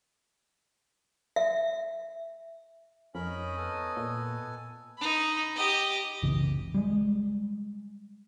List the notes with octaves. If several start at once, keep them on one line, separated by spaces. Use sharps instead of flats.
E5
F2 C#4 D#4 A#4 C#5 D#5 B5
B3 A4 G#5
A#2
D#4 B5
G4 D#5
F#1 C2 C#3 E3
G3 G#3